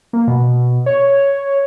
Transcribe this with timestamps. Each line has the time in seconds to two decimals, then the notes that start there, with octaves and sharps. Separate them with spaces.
0.13 A#3
0.28 B2
0.86 C#5